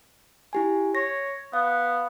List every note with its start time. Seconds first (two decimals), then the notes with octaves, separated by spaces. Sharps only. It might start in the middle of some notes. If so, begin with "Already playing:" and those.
0.53 E4 G4 G#5
0.95 C#5 A#6
1.53 B3 F5